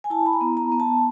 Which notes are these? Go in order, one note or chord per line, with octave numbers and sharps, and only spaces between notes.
G#5
E4 A5
B5
A#5
B3
A#5
B3
A5